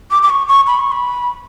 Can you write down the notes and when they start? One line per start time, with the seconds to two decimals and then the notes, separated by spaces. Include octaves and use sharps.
0.11 D6
0.23 D6
0.30 C#6
0.48 C#6
0.67 B5
0.79 C#6
0.92 B5